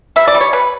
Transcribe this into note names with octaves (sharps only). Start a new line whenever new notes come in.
G3 E5
D5
G3
C#5
G3 B4